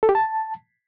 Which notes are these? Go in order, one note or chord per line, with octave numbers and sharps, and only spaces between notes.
A4
G4
A5